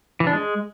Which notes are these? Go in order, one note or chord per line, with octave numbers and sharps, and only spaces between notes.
E3
D4
G#3